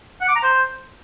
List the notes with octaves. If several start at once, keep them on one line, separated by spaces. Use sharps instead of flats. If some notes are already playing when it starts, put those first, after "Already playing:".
F#5
D6
A#5
C5